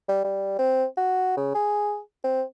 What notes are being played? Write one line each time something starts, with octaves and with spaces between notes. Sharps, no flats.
G3
G3
C4
F#4
C#3
G#4
C4